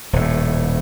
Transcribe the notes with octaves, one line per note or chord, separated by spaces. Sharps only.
D#1 A2